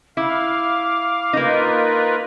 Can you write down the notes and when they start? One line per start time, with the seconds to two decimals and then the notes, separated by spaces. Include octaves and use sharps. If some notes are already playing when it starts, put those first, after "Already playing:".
0.17 E4 F5 D6
1.33 A#3 D#4 F4 A#4 B4